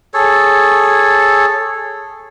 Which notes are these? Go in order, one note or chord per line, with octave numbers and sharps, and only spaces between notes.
G#4 A4 C#5